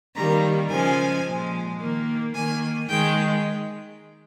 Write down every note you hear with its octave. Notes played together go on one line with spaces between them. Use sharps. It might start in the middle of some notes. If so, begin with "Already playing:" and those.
D#3 G3 A#3 A#5
C#3 F3 G#3 G#5
A#2 F3 G#3
D#3 A#3
D#3 A#3 G#5
D#3 G#3 G5